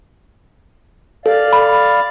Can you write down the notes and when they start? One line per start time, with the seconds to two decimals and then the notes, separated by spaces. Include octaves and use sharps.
1.26 A4 D5 F5
1.53 B5